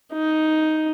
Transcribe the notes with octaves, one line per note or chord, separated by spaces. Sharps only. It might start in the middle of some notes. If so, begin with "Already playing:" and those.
D#4